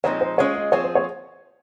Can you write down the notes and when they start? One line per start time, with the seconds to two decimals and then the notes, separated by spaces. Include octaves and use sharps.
0.04 A#2 F3 G#3 C4 D#4 C#5
0.21 C5
0.38 G#3 C#4 F4 G#4 C#5
0.56 D#5
0.72 F3 C4 F4 G#4 C#5
0.84 C5
0.95 C#5